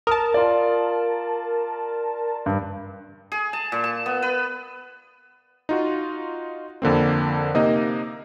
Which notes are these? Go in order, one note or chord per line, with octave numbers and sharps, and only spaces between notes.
A#4 A5 D#6
F4 D5
G2
G#4
A5
A#2
A5
B3
B4
D#4 F4 F#4
F2 D3 A#3 C4
C3 A#3 D#4 D#5